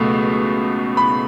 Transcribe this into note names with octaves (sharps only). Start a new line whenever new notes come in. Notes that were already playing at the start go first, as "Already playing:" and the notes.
Already playing: C#2 B2 F#3 A3
B5